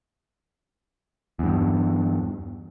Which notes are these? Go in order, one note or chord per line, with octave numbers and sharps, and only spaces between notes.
E2 G2